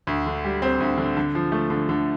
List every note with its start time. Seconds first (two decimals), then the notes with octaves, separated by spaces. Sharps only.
0.07 D2
0.26 D3
0.44 G3
0.62 C4
0.80 D2
0.98 D3
1.17 D3
1.35 F3
1.52 A3
1.70 D3
1.89 D3